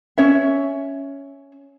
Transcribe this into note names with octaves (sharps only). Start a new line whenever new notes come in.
C#4 C#5 E5